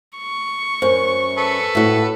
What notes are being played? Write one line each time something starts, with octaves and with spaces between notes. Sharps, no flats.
C#6
F#2 C5
A4 B4
A2 F#4